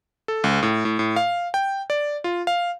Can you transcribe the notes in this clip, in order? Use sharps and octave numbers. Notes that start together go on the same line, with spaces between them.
A4
C#2
A2
A2
A2
F5
G5
D5
F4
F5